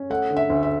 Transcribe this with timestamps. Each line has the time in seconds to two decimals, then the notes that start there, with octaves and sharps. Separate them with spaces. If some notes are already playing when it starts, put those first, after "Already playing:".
Already playing: C#4
0.10 A3 F#5
0.30 D3
0.37 E5
0.50 D2
0.63 E5